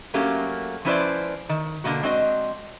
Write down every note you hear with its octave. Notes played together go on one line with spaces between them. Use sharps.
F#3 A3 A#3 C#4 G4
F3 C#4 E4 B4 C5 D5
D#3
B2 D3 F3 A#3 F#4
G#3 C4 D4 F#4 C5 D#5